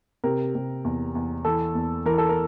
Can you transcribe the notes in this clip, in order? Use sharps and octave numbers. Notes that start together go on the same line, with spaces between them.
C3 A#4
C3
E2
E2
E3 A4
E2
E3 A#4
A4
A#4